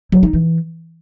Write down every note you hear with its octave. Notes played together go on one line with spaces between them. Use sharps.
F#3
D#4
E3